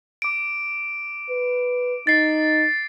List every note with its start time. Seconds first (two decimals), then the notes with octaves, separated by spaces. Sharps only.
0.22 D6 D7
1.29 B4
2.07 D#4 A6 C7